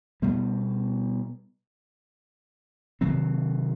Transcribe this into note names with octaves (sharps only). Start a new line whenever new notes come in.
B2 G3 B3
C3 D#3 F#3 C4